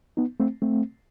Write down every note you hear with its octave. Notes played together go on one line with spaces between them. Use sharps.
B3 D#4
A3 C4
A3 C4